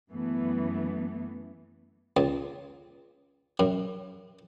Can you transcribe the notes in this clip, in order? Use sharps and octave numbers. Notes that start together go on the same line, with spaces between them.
F#2 E3 A3 B3
C#2
F#2